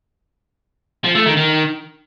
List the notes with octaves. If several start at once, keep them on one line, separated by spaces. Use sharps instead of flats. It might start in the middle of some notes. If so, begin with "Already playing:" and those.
F3
A3
D#3
D#3